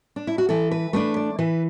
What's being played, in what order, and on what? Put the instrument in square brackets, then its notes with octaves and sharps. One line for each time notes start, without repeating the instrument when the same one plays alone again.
[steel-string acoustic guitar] D4
E4
F#4
E3 A4
B4
A3 D4 B4
D5
E3 B4